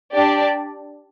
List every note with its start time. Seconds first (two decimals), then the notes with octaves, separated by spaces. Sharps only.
0.13 D4 G4 D5